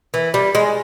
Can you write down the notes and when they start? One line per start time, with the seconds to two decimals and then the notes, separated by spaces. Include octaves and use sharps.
0.14 E3
0.34 G3
0.55 G#3